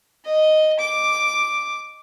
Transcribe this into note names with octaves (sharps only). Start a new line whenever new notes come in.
D#5
D6